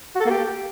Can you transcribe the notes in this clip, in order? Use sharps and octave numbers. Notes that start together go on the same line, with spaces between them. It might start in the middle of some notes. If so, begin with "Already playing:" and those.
F#4
A4
A#3
G4